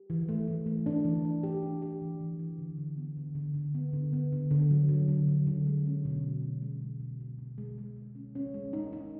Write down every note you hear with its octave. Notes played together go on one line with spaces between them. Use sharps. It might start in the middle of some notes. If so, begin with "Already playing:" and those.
Already playing: G4
E3
A3
E3
A3
D4
E3
D4
G4
D4
G4
E3
E3
E3
D3
D3
B3
D3
D3
D3
B3
D3
B3
D3
D3
F#3
F#3
D3
F#3
D3
G#3
C#4
B2
C#4
C#4
G#3
B2
B2
B2
B2
G#3
G#3
G#3
C#4
C#4
G#3
D#4
D#4